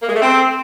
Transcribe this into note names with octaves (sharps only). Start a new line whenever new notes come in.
A#3
G#3
A3
C4